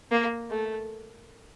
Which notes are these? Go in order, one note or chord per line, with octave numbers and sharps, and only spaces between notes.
A#3
A3